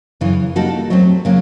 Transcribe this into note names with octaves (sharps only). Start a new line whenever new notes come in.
F#2 C#3 E3
G3 A#3 D#4 F#4 A4
F#3 A3 C4
C#3 F#3 A#3